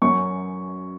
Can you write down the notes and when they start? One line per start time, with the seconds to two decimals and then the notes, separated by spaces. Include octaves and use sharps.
0.02 F#2 F#3 C#4 C#6